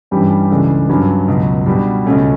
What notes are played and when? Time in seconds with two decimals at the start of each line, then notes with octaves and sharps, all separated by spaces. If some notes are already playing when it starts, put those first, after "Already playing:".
0.11 G2 E3 G3 C#4 G4
0.50 C#2 C#3 E3 A3 D4
0.89 G2 F#3 C#4
1.28 C#2 B2 F#3
1.66 B2 G3 D4 F#4
2.06 C#2 B2 A3 C#4